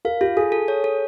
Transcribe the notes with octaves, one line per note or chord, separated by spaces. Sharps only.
A#4 F5
F4 G4
G#4 A4
A4
C#5
A4